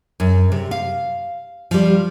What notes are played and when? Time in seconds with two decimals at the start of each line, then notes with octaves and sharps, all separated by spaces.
0.20 F#2
0.52 C3
0.71 F5
1.71 F3 G3